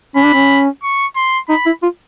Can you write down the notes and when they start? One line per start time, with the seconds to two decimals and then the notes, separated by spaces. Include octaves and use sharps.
0.16 C#4 B5
0.25 D4
0.34 C#4
0.83 C#6
1.16 C6
1.49 D#4 B5
1.66 E4
1.83 F4